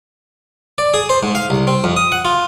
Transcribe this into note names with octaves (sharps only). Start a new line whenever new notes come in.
D5
G#4
C5
G#2
F5
C2
C4
F2
D#6
F#5
F4